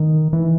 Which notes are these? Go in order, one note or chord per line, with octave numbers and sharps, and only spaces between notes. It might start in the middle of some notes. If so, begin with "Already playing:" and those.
Already playing: D#3
E3